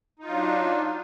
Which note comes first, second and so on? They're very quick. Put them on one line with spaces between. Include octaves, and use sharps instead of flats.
D#4 F4 F#3 D4